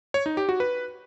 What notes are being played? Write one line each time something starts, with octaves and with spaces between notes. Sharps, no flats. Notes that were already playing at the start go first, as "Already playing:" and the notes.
C#5
D#4
G4
F#4
B4